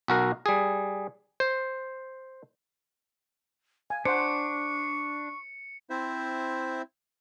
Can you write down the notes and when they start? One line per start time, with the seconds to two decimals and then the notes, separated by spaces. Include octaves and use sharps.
0.08 B1 F#4 A#4
0.46 G3 G#4
1.40 C5
3.90 F5 G#5
4.05 D4 C5 F#5 C#6 C#7
5.90 C4 E4 C5 E5